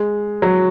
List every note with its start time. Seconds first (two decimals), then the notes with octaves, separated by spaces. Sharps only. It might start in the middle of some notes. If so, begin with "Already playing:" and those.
Already playing: G#3
0.42 F#3